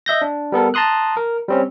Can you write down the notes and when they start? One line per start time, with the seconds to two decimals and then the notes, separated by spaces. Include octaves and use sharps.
0.06 D#5 E5 G6 A#6
0.22 D4
0.52 G3 B3 A4 A#4
0.74 A5 A#5 C6 D#6 F#6
1.17 A#4
1.48 G3 C4 C#4